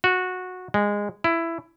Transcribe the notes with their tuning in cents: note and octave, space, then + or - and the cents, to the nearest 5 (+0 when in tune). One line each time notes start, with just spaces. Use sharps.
F#4 -15
G#3 -15
E4 +10